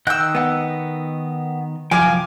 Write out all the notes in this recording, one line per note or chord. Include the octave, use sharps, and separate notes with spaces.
D#3 D#5 G5 E6 F#6
B3 F#5
C2 F#2 F3 F5 G5 G#5 D6